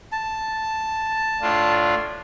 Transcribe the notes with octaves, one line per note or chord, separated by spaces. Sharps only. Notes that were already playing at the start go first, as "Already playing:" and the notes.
A5
A2 D4 F4